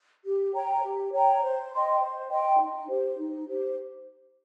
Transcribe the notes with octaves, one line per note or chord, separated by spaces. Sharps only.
G4
C#5 G5 A#5
G4
C#5 G5 A#5
C5
D#5 G5 C6
C5
D#5 G5 C6
D#4
G4 C5
D#4
G4 C5